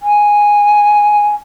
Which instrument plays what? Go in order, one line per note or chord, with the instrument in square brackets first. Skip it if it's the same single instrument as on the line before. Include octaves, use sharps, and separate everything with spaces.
[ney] G#5